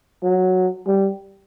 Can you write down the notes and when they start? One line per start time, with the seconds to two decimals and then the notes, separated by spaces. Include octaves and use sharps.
0.23 F#3
0.87 G3